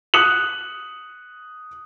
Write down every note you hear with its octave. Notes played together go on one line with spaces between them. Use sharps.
D#6 F#6 C#7 F#7